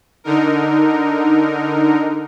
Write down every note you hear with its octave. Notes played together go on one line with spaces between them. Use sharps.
D3 D#4 A#4